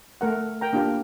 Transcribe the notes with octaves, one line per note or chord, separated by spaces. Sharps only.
A3 A#4 F#5
A#4 G5 A#5
A#3 D4 F4 G4 A#4